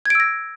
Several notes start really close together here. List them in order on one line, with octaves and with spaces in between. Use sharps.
G#6 D7 E6 A#6